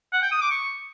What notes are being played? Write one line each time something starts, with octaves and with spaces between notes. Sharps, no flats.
F#5
G5
D#6
D6
C#6